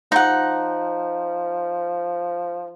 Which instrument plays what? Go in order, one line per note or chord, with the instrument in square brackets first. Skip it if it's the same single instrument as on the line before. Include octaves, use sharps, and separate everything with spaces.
[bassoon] F3 [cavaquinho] D#4 F#5